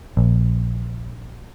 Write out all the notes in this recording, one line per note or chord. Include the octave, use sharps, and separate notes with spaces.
A#1